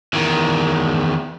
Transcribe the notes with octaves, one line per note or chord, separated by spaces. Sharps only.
E2 D#3